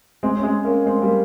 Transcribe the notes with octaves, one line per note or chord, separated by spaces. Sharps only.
G#3 C4
C#4
G#3 C4
A#3 C#4
G#3 C4
G3 A#3